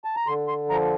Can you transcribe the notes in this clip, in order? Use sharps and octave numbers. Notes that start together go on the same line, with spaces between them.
A5
A#5
D3 C6
C6
F3 A#5